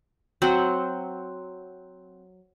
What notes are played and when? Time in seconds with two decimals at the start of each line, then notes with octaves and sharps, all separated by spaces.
0.42 F#3 C4 F#5